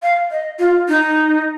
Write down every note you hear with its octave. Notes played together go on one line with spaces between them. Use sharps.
F5
D#5
F4
D#4